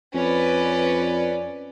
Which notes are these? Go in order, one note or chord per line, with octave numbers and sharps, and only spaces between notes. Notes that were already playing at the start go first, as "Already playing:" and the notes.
F2 C#4 B4 D5